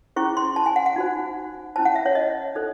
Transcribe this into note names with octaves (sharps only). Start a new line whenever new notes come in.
C#4 E4 G#4 C5 C#6
C6
A5
G#5
F#5
F#5
D#4 F#4 C5
C#4 E4 C5 A5
F#5
E5
C#5
D#5
D#4 A4 C5